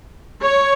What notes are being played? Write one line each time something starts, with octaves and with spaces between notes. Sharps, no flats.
C#5